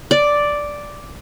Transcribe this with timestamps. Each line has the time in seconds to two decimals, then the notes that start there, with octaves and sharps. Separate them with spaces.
0.11 D5